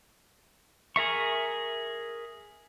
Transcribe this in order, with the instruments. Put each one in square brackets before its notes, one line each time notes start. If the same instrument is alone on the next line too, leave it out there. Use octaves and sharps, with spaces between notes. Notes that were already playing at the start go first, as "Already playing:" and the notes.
[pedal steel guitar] G#4 A#4 E5 C#6